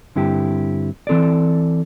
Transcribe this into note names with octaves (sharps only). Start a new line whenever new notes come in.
G2 D3 C4 E4 G4
E3 C4 A4 D5